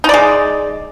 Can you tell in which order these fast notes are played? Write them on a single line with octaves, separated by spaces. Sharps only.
D#4 D5 G#3